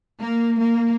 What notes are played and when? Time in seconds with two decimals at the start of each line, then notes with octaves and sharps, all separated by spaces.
0.21 A#3
0.61 A#3